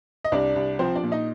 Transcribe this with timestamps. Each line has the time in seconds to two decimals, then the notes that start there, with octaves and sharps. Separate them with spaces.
0.25 D#5
0.32 C2 D4 D5
0.56 C2
0.79 F3 C4 C5
0.95 D4 D5
1.03 A#2
1.12 D#4 D#5